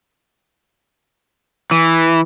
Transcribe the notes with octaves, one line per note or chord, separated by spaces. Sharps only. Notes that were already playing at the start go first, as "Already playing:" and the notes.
E3